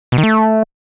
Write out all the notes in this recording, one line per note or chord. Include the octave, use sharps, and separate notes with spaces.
B2
D#3
A3